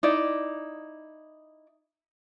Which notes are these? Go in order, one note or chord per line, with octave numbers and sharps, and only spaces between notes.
D#4 E4 D5